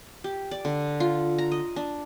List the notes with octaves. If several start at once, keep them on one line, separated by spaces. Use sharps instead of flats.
G4
D5
D3
F4
A#5
D#5
D4